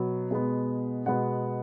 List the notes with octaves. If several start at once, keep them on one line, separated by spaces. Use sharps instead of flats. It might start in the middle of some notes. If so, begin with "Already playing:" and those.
Already playing: B2 F#3 B3
B2 G#3 B3
B2 G#3 B3 F#5